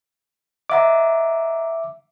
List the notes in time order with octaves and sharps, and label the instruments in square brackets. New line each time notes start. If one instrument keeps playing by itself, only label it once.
[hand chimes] D#5 F#5 A#5 [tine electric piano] E5 D6